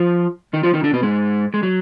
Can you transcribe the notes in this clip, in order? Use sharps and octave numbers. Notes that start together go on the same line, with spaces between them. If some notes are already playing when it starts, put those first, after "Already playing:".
Already playing: F3 F4
D#3 D#4
F3 F4
D#3 D#4
D3 D4
B2 B3
G#2 G#3
G#3
F#3